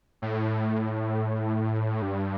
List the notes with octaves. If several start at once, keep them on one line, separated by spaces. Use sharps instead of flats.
A2
G2